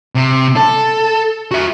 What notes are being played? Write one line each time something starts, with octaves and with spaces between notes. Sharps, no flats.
C3
A4
F#4 E5